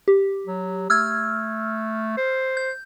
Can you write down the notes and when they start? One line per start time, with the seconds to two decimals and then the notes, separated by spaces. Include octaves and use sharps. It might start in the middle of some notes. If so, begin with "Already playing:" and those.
0.08 G4
0.46 F#3
0.90 A3 E6 F6 G#6
2.17 C5
2.57 G6